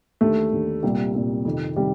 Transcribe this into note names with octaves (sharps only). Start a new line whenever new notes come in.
D#2 D3 A3
D#2 D3
C2 A#2 G3
C2 A#2
F2 C3 D#3
C3 D#3 G3